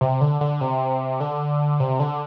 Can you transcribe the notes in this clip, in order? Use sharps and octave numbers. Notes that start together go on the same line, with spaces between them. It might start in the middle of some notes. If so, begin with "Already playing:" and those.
C3
D3
D3
C3
D3
C3
D3